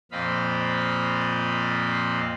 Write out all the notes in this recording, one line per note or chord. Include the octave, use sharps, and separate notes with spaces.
F2 A#2 C4 D#5 F5 B5